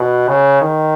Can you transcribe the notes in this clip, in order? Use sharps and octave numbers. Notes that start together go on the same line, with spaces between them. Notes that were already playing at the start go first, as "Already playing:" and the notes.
Already playing: B2
C#3
D#3